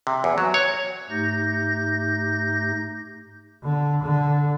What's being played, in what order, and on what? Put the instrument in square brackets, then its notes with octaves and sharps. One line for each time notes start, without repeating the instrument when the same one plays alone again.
[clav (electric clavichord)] C3
E2
F#3
C#5
[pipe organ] G#2 A3 D#4 G4 G6 A#6
[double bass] D3
D3